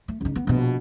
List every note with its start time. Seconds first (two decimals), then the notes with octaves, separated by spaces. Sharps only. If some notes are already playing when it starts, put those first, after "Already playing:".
0.08 A3
0.21 C#2 D#4
0.36 B3
0.47 A#1 B2